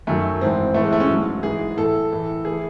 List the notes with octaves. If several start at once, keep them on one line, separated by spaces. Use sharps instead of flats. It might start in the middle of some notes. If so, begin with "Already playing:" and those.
F#2 D#3 F#3 A3
G#2 E3 C4
A2 E3 A3
G#3
A3
C#4
G#2 F#3
G#2 E3 G#4
A2 E3 A4
A2 E3
E3 G#4